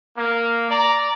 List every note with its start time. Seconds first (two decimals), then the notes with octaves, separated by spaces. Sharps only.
0.17 A#3
0.70 D5 A#5